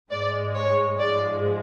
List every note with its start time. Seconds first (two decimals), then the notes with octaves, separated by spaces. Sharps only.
0.10 G#2 G#3 D5
0.55 C#5
0.99 G#2 F3 G#3 D5